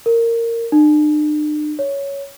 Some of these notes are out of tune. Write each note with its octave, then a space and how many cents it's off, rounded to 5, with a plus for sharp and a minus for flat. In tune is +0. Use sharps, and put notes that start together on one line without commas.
A#4 -15
D4 +45
C#5 +5